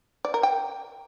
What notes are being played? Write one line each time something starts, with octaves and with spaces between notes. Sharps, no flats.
D5
A#4
G5